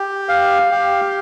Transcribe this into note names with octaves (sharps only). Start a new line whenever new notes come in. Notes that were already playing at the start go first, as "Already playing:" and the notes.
Already playing: G4
F5
G4